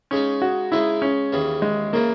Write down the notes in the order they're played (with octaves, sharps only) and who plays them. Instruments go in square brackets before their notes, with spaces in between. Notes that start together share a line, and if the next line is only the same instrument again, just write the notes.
[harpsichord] C#3 G#3 D#4 [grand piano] C#4
[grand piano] F#4
[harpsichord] C#3 G#3 D#4 [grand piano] E4
[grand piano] C#4
[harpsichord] D#2 C#3 E3
[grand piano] G#3
[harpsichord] C#3 E3 [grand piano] A#3